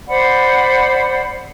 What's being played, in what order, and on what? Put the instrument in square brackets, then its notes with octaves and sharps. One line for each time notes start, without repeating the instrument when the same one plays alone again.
[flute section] C5 D5 F#5 B5